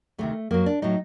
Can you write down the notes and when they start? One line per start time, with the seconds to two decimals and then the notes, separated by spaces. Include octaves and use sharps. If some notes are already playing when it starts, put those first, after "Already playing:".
0.18 D2 C3 D#3 A3
0.51 F#2 F#3 A#3
0.66 D4
0.82 A2 F#3 D#4